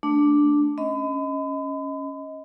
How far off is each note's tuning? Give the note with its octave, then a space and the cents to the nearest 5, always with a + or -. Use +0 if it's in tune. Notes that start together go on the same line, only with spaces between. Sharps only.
A3 +0 D4 +0
C#4 +0 D#5 +20 B5 +40